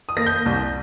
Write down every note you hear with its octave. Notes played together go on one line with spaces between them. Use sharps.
D#6
A#3 A#6
G6
C2